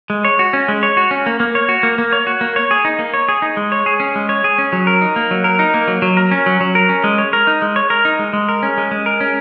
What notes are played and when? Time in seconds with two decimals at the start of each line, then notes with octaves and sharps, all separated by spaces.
0.10 G#3
0.25 C#5
0.39 F#4
0.53 C#4
0.68 G#3
0.83 C#5
0.97 F#4
1.11 C#4
1.26 A#3
1.40 A#3
1.55 C#5
1.69 F#4
1.83 A#3
1.98 A#3
2.13 C#5
2.27 F#4
2.41 A#3
2.56 C#5
2.71 G#4
2.85 D#4
2.99 A#3
3.14 C#5
3.29 G#4
3.42 D#4
3.57 G#3
3.72 C#5
3.86 G#4
4.00 C#4
4.15 G#3
4.29 C#5
4.44 G#4
4.58 C#4
4.73 F#3
4.87 A#4
5.01 D#4
5.16 A#3
5.31 F#3
5.44 A#4
5.59 D#4
5.74 A#3
5.88 F#3
6.02 F#3
6.17 A#4
6.31 C#4
6.46 F#3
6.60 F#3
6.75 A#4
6.89 C#4
7.04 G#3
7.18 C#5
7.33 A#4
7.47 D#4
7.62 G#3
7.76 C#5
7.90 A#4
8.05 D#4
8.19 G#3
8.33 G#3
8.49 A#4
8.63 C#4
8.78 G#3
8.91 G#3
9.06 A#4
9.21 C#4